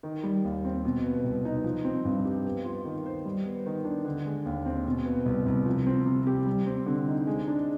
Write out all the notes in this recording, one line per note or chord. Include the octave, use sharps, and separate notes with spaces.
D#3
G3
D#2
C4
B2
B3
C2
D#4
F3
C4
G2
G4
B3
F4
D#3
C5
G3
B3
D#3
D4
D3
G#3
D#2
C4
B2
B3
C2
C2
F3
C4
C3
G4
G3
C4
D3
D#4
G#3
D4